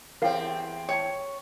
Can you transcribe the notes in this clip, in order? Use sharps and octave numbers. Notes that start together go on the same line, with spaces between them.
E2 C4 E4 G4 A#4 C#5 F5
C#5 G5 A5 C#6